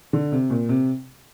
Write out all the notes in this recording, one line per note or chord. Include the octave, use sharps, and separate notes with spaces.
D3
C3
A#2
C3